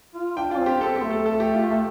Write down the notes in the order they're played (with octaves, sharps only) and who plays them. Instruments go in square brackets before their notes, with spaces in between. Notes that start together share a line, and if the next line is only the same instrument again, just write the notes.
[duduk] F4
[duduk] D4 [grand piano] G5
[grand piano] F4
[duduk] C4
[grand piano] G4
[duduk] C4 [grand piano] A4
[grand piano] G4
[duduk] A3
[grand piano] A4
A4
G4
F4
G4